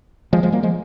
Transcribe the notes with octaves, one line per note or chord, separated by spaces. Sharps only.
F3 G#3
F3 G#3
G3 A#3
F3 G#3